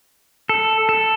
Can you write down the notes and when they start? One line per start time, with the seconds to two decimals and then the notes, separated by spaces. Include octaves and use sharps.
0.49 A4
0.89 A4